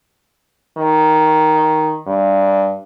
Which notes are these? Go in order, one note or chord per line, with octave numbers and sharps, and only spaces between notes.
D#3
G2